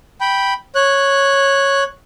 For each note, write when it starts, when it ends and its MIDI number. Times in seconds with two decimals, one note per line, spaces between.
0.21 0.54 79
0.21 0.54 83
0.75 1.84 73
0.75 1.84 90